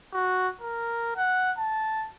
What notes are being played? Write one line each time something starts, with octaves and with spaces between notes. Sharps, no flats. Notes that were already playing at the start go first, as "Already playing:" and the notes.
F#4
A#4
F#5
A5